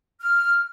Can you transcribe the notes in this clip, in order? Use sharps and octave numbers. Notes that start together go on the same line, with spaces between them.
F6